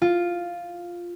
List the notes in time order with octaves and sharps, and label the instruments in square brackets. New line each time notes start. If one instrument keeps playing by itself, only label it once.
[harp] F4